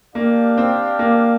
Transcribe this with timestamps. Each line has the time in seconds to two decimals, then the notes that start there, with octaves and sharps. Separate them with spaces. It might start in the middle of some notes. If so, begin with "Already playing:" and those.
0.14 A#3 D4 G4 D5 F5
0.58 C4
0.99 A#3